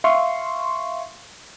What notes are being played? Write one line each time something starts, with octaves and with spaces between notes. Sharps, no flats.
E5 F5 C6 C#6